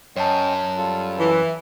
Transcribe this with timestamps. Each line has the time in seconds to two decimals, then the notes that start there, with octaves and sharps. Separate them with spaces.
0.16 F#2 C#4 C#5 D#5 G5 A5
0.77 G3 F4 A4
1.18 E3